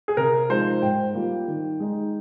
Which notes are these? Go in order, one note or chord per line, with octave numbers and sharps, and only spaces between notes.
G#4
C3 A#4
F3 G#3 D#4 C5
G#2 G5
G3 A#3 F4
D#3
G#3 D#4